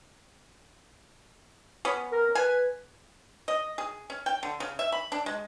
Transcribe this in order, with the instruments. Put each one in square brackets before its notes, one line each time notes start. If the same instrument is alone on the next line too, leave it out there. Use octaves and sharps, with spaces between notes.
[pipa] B3 C#4
[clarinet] A#4
[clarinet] B4 [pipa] G#5
[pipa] D#5
G#4
C#4
G5
D3
C#3
E5
B5
D4
G#3